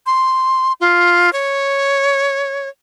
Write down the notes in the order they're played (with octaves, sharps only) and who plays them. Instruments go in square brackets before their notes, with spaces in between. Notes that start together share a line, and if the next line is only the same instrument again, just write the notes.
[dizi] C6
F4
C#5